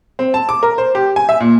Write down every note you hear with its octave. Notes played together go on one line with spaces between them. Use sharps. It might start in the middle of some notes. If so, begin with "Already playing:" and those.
C4
A5
D6
A#4
C5
G4
G#5
E5
A#2